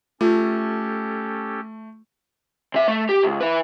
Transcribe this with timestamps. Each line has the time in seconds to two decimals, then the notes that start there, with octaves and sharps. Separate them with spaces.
0.21 A3 C#4 F4 G4 A4
2.74 C3 E5
2.88 A3
3.09 G4
3.23 C#2
3.41 E4 B4